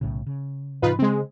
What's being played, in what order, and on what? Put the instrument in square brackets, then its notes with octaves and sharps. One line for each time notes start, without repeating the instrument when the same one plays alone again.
[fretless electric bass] B1 A2 C#3
C#3
[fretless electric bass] G#2 C3 E3 [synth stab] D#4 F4 B4
[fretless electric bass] C#3 [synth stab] G#3 C4